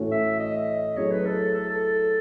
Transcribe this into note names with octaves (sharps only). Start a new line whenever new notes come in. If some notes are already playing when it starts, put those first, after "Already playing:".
Already playing: A2 E3 A3 C#4 F#4
E5
D#5
F#3 A3 C#4 E4 G#4 C#5
B4
A4
A4
A4